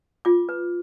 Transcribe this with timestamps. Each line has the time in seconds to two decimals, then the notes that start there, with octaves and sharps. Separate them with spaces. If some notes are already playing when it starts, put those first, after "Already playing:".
0.25 F4 D6
0.49 B4